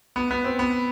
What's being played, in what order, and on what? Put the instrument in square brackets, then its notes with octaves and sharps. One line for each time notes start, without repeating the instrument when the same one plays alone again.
[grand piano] B3
B3
C4
B3